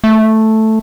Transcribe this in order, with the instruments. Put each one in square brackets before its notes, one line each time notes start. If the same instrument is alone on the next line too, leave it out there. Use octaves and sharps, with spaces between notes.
[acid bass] A3